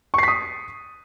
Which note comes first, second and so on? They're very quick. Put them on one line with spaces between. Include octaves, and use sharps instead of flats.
C#6 C7 B6 D#6